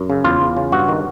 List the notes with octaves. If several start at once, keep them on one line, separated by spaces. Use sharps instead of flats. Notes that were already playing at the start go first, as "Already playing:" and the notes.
Already playing: F#2
C#3
E2 F4
E2
C#3
G2 F#4
D#3